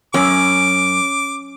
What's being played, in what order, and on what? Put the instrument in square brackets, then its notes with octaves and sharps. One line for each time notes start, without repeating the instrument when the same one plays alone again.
[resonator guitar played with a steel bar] F#2 [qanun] C#4 [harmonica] D6